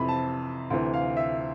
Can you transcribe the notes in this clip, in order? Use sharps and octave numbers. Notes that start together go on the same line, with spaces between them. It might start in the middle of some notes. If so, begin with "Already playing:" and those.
Already playing: F2 C3 E3 B5
A5
D2 C3 E3
F5
E5